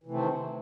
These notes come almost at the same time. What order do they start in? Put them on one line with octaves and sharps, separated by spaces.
E3 C3 A3 C4 D#3